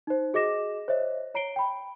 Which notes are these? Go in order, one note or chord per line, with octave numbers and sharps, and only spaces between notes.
D#4 C5
F#4 G#4 D#5 D6 A#6 E7
C5 C#5 D#5 E5
C#5 A#5 C7 D7 G7
G5 B5